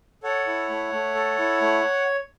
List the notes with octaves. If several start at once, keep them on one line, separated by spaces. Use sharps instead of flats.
A4 C#5 F#5
E4
A3
A3
A4
E4
A3